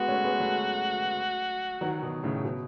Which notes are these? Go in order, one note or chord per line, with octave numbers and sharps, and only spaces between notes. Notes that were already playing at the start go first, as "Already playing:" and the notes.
Already playing: G#3 B3 F#4
A3 C#4
G#3 B3
F#3 A3
D#3 F#3
B2 D#3
A2 C#3
B2